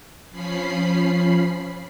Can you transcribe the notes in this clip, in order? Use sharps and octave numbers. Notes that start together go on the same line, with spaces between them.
F3 C#4 B5 C7